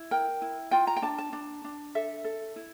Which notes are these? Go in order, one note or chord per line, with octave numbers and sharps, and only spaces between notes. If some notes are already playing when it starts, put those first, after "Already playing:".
Already playing: E4
A#4 G5
E4
F4 G5
A#5
G5
D4 A5
A5
D4
D4
A4 E5
A4
E4